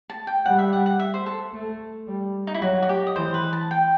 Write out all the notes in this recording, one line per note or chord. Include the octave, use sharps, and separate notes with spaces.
A5
G5
G3 F#5
E5
F#5
F#5
E5
C5
A4
A3
G3
D#4
E4
F#3 F#4
F#4
G4
D#5
E3 C5
B4
A5
G5